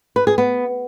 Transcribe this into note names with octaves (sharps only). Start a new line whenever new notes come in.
B4
G#4
B3